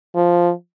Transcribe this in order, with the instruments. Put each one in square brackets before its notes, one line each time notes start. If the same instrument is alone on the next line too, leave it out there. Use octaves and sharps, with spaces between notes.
[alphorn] F3